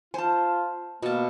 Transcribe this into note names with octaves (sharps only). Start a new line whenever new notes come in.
F4 C5 G#5 A5
B2 A#3 A5